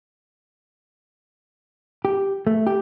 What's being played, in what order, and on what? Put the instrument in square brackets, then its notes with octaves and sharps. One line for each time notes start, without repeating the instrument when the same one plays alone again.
[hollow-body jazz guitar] G4
A3
G4